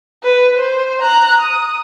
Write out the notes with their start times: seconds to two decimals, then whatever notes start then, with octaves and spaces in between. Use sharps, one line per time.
0.23 B4
0.57 C5
1.02 A#5 F#6
1.40 D#6